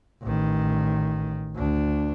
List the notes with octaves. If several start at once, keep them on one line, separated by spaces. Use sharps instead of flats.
A1 D#3
D2 D4